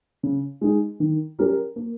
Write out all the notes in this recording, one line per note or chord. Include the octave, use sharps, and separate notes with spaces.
C#3
G#3 D#4 G#4
D#3
G3 C#4 G4 A#4
A#3